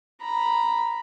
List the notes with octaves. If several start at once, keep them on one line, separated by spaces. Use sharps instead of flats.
A#5 B5